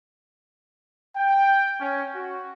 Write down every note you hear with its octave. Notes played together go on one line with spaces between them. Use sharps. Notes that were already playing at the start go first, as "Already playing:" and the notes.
G5
C#4
F#4